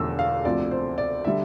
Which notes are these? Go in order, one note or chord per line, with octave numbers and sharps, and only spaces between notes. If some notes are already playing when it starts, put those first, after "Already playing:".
Already playing: E1 E2 D3 F3 A3 E6
F5
D2 C3 F3 D5
C5
D5
D3 G3 E5